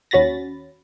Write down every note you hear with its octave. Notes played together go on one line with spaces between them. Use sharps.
D#2 C#4 F#4 B5 A6 A#6